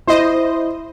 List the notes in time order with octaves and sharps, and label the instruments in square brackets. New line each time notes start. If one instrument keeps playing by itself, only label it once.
[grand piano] E4 [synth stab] C5 D#5